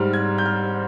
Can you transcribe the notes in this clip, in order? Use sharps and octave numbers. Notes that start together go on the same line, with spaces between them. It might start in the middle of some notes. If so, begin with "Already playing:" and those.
Already playing: G#2 G3 F6
G#6
G6
F6